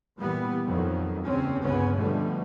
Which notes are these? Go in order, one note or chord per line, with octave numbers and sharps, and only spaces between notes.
A#2 E3 G3 B3
F2 D#3 F#3
F#1 E2 G3 C4 C#4
G1 C#2 C#3 B3 C#4
B2 D3 F3 G3 A3